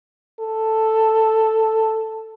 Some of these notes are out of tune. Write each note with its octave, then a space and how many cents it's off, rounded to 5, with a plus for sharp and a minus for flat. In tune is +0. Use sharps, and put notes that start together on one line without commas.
A4 +5